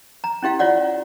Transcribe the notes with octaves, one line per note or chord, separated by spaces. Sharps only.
A#5
C#4 E4 G4 F5
F4 C#5 D5 F#5